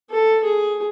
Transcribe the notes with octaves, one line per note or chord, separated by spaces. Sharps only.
A4
G#4